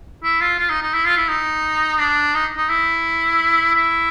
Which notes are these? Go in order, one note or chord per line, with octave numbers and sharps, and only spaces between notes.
E4
F4
F4
D#4
D#4
E4
F4
E4
D#4
D4
D#4
D#4
E4
E4